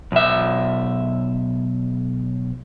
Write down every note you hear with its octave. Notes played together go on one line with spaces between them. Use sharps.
B1 E5